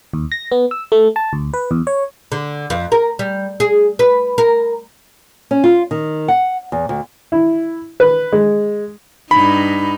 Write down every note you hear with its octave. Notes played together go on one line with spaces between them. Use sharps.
D#2
A#6
B3
E6
A3
A5
D2
B4
E2
C#5
D3
F2
A#4
G3
G#4
B4
A#4
C#4
F4
D#3
F#5
E2
D2
E4
B4
G#3
G2 D#4 B5